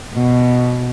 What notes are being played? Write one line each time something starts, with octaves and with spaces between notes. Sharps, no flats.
B2